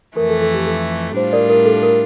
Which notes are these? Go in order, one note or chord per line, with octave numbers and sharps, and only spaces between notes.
F2 E3 A3 A#4
A4
A4
G4
A4
A2 G3 D4 F4 C5
A#4 D5
A#4
A4
A#4